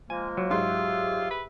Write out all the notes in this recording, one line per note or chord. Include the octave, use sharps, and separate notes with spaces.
F3 G#3 A#3 G#5
F#3
G#2 F4 G4 G#4 E5 C6
B4